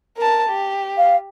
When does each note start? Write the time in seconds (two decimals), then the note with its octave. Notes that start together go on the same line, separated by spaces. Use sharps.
0.17 A#4 A5
0.50 G4
0.98 F5